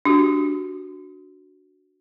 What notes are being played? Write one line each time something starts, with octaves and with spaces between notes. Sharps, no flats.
D4 F#4 G4